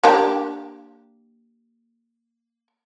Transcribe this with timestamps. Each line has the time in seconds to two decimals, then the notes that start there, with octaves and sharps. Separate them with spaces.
0.04 A#3 D4 G4